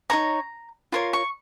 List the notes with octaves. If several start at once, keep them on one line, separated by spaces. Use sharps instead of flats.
D#4 A#4 C#5 A#5
F4 A#4 C#5 C6
C#6